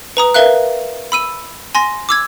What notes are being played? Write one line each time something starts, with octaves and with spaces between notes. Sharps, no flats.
B4 A#5 D#6
A#4 B4 E5 F5 F#6
B5 E6 D#7
G#5 C6 A#6
D6 E6 G#6